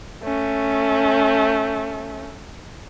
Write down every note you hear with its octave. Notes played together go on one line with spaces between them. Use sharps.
A3 C#4